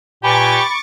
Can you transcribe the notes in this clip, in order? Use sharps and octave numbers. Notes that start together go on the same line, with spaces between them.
A#2 G4 B4 G#5 B5 C#6 D6 A6